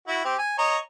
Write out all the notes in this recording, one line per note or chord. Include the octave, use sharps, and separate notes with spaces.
E4 F#4
C4 G4
G#5
C#5 D#5 A#5